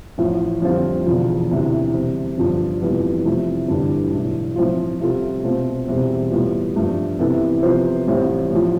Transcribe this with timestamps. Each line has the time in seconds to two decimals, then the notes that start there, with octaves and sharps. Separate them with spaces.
0.18 A1 A2 F3
0.62 F2 D3 G3 C4 F4
1.06 E1 E2 D3 F3
1.49 E1 D2 C3 E3
1.93 C3 G3 C4
2.38 G1 G2 F3
2.82 F1 F2 E3 G3 B3
3.25 C3 F3 A3 E4
3.68 G1 G2 E3 G3 D4
4.13 B1 A2 E3
4.56 A2 F3 C4 F4
5.00 C3 G3 C4 F4 A4
5.44 B2 A3 C4 F4
5.88 E1 E2 C3 G3 C4
6.32 A2 G3 B3 F4
6.76 G2 F3 A3
7.19 C3 E3 B3 E4 A4
7.63 C3 F3 B3 F4 C5
8.07 A1 A2 E3 G3 C4
8.51 A1 A2 F3